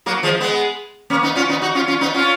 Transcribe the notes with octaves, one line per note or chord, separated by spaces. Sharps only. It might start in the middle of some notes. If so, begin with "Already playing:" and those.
F#3 A#3
F3 G#3
G#3 B3
A#3 C#4
B3 D#4
C#4 F4
B3 D#4
D#4 F#4
C#4 F4
C#4 F4
B3 D#4
C#4 F4